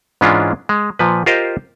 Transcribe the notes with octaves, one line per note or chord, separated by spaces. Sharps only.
G#2 E3 G#3 C#4 D4 F4
G#3
A#2 F3 B4
F4 G4 A#4 C5 D#5 F5